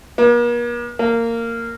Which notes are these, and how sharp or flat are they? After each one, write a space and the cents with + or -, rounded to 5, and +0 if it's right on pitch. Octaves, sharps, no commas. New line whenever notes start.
A#3 +45
A#3 -15